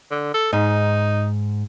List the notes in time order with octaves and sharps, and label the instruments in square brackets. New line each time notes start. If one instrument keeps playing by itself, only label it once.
[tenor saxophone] D3
A4
[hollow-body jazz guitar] G#2 [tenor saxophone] D#4